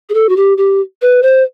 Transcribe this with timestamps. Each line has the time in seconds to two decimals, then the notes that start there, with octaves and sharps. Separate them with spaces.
0.09 G#4
0.14 A4
0.29 F#4
0.37 G4
0.58 G4
1.02 B4
1.23 C5